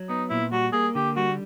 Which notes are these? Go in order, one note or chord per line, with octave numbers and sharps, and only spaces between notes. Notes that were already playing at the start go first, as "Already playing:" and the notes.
Already playing: F#3
B3 D#4
A#2 E4
G3 F#4
A#3 G#4
D3 G4
G3 F#4